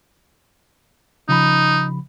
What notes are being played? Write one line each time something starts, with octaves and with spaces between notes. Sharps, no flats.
C#3 F3 D#4 B5